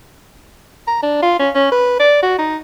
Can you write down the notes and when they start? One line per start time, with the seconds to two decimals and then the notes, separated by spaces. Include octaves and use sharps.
0.87 A#5
1.02 D4
1.23 F4
1.39 C#4
1.55 C#4
1.72 B4
2.00 D5
2.23 F#4
2.38 D#4